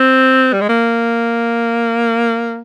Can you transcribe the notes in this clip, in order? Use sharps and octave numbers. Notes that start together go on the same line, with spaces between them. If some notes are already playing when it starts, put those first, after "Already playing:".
Already playing: C4
G3
G#3
A#3